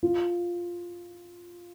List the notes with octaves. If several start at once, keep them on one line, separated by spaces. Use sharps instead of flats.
F4